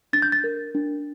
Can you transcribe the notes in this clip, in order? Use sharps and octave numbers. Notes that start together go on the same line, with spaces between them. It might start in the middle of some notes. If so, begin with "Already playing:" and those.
D4 A6
G6
A6
A#4
D4